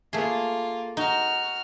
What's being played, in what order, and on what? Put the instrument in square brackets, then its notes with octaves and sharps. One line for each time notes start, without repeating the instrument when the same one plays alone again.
[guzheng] A3 G#4 [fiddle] A#3 F4
[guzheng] D#4 [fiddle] F#4 F6